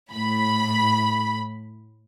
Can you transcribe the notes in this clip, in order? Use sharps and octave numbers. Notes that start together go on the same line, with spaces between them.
A2 B5